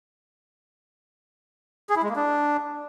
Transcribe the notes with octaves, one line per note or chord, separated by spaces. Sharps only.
G#4
E4
G#3
A#3
D4